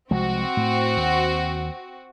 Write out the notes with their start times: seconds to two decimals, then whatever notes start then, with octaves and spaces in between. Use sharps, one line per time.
0.11 C2 F3 G#3 C4 F#4
0.57 A2
0.97 D#2